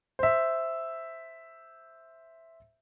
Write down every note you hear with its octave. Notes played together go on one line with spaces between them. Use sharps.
C5 E5